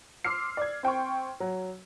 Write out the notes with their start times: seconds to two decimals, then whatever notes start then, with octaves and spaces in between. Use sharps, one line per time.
0.25 C6 D6 E6 F6 C7
0.57 D5 G#6
0.83 C4 G5 C6 C#6
1.40 F#3